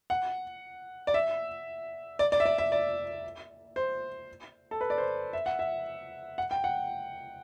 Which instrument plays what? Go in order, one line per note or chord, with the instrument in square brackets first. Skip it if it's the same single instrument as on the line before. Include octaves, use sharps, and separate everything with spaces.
[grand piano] F#5
D5
E5
D5
D5
E5
D5
E5
D5
C5
A4
B4
D5
C5
E5
F#5
E5
F#5
G5
F#5